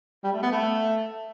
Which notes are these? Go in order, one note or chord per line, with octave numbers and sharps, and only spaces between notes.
G3
A3
B3
A3